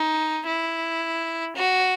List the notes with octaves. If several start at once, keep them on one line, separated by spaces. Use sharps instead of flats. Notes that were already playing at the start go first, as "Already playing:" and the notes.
Already playing: D#4
E4
F#4